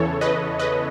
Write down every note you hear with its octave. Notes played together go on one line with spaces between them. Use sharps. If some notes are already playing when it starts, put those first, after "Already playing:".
Already playing: E2 C#3 E3 A4 C#5
B4 D#5
B4 D#5